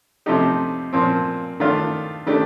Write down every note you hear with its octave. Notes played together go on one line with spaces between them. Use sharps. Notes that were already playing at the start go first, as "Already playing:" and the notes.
C3 F3 A3 D#4 G4
A#2 F3 C4
D#3 A3 D4 F4
D#3 A3 D4 G4